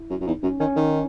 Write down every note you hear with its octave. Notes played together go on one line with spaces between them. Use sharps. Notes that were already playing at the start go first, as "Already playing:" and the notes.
Already playing: E4
F#2
F#2
E2 D#4
F#2 C#4
D#3 C#4
D#3 D#4